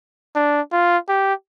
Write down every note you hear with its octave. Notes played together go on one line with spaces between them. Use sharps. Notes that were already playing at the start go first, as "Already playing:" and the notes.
D4
F4
G4